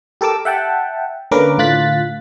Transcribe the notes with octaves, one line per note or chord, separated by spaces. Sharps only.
G4 A4 A#4 D6 E6
E5 F#5 G5 A5
D3 A#3 C#4 A#4 B4 D6
A2 D3 F4 F#6 A6 B6